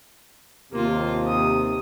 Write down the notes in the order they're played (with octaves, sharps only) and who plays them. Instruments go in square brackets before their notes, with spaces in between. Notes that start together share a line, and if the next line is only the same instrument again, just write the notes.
[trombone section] D#2 C3 [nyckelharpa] A#3 F4
[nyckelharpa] D#6